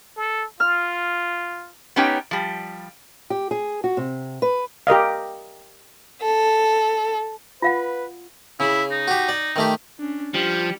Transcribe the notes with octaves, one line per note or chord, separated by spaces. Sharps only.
A4
F4 F6
B3 C#4 D#4 G4 C#5 G5
F3 G3
G4
G#4
F#4
C3
B4
G4 A#4 D#5 F5
A4
F4 B4 F5 F#5
C#3 E4
D#4
F#4 G4
D5
D#3 A3 G4
C#4 D4
F3 G3 G4 C#7